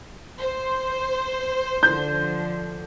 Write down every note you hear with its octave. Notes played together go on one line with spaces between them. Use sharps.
C5
D3 F3 G6